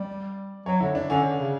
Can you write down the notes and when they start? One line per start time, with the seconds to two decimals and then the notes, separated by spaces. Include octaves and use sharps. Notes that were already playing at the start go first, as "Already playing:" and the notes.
Already playing: G3 D5
0.66 F#3 C#5
0.80 D3 E4
0.95 D4
1.10 D3 C#4
1.25 D3
1.39 C#3